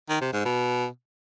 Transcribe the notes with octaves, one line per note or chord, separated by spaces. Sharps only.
D#3
C3
G#2
B2